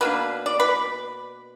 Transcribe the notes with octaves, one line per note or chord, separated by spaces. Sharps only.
B2 A#3 D4 B4
D5
B4